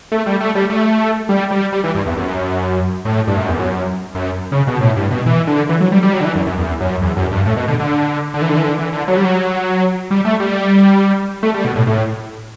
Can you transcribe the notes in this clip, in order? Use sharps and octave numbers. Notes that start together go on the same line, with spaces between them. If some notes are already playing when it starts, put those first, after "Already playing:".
A3
G3
A3
G3
A3
G3
G3
G3
E3
G2
E2
F#2
A2
G2
F#2
E2
F#2
F#2
C#3
B2
A2
G2
B2
E3
D3
E3
F#3
G3
G3
F#3
D3
E3
F#2
F#2
E2
F#2
E2
F#2
G2
A2
B2
D3
D3
D3
E3
D3
E3
D3
E3
D3
F#3
G3
F#3
G3
A3
G3
A3
G3
B2
A2
A2